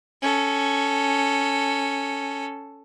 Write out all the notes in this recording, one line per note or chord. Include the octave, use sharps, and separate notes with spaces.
C#4 A4